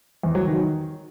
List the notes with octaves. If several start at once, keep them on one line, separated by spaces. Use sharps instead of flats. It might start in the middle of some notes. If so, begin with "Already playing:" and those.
E2
F#3
D#3